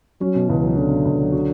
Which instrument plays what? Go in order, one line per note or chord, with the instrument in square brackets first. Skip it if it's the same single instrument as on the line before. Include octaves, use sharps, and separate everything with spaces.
[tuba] F#3 [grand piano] C#4
[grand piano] B2
[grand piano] C#2 [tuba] E3
[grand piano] F#3
[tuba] D3 [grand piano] C#4
[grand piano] B2
C#2
F#3
F#4